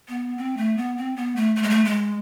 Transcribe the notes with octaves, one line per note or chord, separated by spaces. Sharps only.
B3
C4
A3
B3
C4
B3
A3
A3
G#3
A3
G#3